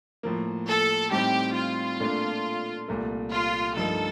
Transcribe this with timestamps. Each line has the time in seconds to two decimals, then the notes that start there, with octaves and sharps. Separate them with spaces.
0.23 A2 F3 A#3
0.67 A4
1.11 A2 G3 C4 D#4 G4
1.55 F4
2.00 A#2 A3 D4
2.88 C2 A#2 A3
3.32 F4
3.77 G2 F3 A3 D#4 A4 A#4